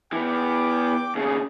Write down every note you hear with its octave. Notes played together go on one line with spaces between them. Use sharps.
E3 B3 G5 D6
D#2 C#3 G#4